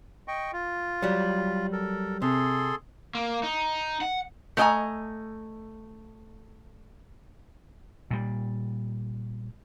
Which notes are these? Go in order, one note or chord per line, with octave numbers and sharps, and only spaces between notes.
D#5 G5 C#6
F4
F#3 G3
A4 A#4
C3 G#4 A4 C6
A#3
D#4
F#5
A3 B3 D#5 G5 G#5 A#5
A#2 G3